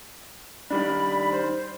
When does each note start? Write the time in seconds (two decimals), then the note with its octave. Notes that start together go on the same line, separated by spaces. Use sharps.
0.71 D#3 G3 D4 B5
1.31 C5